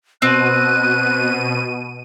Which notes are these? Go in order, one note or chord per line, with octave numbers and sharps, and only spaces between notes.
B2 C4 F#6 D#7